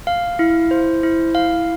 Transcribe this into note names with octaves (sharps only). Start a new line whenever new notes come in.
F5
E4
C5
E4
F5